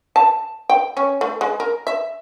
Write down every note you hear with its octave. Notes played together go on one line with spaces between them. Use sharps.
A5
G5
C#4
A3
G#3
A#4
E5